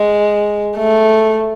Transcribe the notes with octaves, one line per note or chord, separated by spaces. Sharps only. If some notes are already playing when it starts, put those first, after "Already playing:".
Already playing: G#3
A3